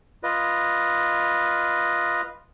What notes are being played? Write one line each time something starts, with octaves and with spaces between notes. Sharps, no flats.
F4 B4 D#5